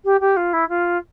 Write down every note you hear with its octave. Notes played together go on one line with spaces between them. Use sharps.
G4
G4
F4
E4
F4